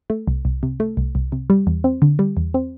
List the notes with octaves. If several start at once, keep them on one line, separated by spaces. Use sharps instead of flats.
A3
C2
C2
C3
A3
C2
C2
C3
G3
E2
C4
D3
G3
E2
C4